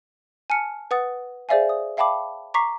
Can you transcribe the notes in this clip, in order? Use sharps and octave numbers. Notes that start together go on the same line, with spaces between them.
G#5 A5 F6 C#7
B4 F#5 D#6 A6
G#4 C5 D5 E5 F5 G#5
D#6
E5 F5 G5 A5 B5 D6
A#5 C#6 D6 B6 C7